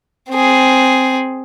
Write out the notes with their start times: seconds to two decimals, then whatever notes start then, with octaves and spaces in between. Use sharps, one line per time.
0.30 C4 G#4